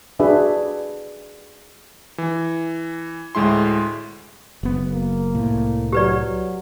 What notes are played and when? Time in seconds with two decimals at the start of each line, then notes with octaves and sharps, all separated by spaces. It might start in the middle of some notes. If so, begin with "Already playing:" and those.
0.19 D4 F#4 G#4 B4 E5
2.18 E3
3.35 D2 A2 G#3 E4 C6
4.63 F#1 B3
4.93 A#3
5.35 C2 A2
5.92 F#3 G4 B4 D5
6.26 F#3